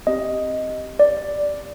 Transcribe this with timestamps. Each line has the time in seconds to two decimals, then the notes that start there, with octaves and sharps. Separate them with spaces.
0.07 C4 G4 D#5
0.99 D5